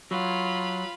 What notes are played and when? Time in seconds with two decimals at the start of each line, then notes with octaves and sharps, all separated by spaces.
0.11 F#3 F4 B5